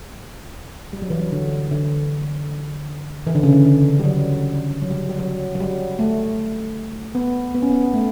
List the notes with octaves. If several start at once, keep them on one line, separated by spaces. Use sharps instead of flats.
G3
F#3
E3
F#3
D3
D3
E3
D3
C#3
D3
D3
G3
F#3
F#3
G3
F#3
G3
F#3
F#3
G3
A3
B3
B3
C#4
B3
A3